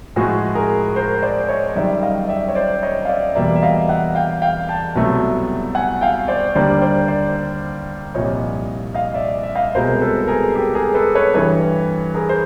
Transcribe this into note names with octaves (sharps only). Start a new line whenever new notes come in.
A2 F3 G#3 F#4 G#4
G#4 A#4
A#4 C5
C5 D5
C#5 D#5
F#2 D#3 G3 D5 E5
D#5 F5
D5 E5
C#5
C5 D5
C#5 D#5
F5
D5 E5
E2 B2 G3 A#3 D5 E5
E5
D#5 F5
E5 F#5
F5 G5
F5 G5
G5 A5
C2 B2 F#3 A3
F#5 G#5
F5 G5
C5 D5
D#2 D3 G3 A#3 C5 D5
C5 D5
C5 D5
C2 A#2 F3 C#5 D#5
D#5 F5
D5 E5
E5
D#5 F5
C2 B2 G#3 A#4 C5
A4 B4
G#4 A#4
G4 A4
G#4 A#4
A4 B4
B4 C#5
G2 E3 G3 B4 C#5
G#4 A#4
C5